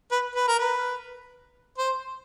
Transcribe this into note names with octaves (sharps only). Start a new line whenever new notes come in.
B4
B4
A#4
B4
C5